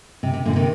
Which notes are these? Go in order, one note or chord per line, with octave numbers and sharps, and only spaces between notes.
C3
C3
A#2 D3
C3 D#3